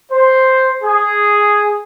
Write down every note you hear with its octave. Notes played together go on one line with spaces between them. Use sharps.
C5
G#4